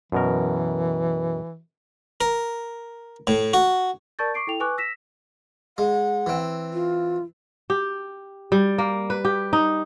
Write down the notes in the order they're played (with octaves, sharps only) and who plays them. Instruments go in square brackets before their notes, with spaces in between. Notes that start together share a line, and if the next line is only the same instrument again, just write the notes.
[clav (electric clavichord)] F#2 B2 A#4 [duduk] E3
[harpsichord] A#4
A2
F#4
[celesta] A#4 D5 A5 C#6 G6 A6
C#6 D6 C7 D7
E4 A4 G5 F7
B4 G#5 C#6 D6 F#6
E6 A#6 B6 E7
[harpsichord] G#3 [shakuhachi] F#5
[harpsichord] E3 C4
[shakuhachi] F4
[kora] G4
G3
A#3
B4
G4
D#4